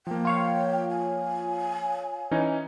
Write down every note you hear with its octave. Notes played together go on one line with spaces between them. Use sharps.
F3 A#3 G5
F4 C#5 F5
G#5
E3 C#4 D#4